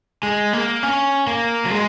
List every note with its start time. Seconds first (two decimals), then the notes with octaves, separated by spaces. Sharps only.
0.23 G#3
0.53 A#3
0.83 C#4
1.27 A#3
1.65 F#3
1.71 G#3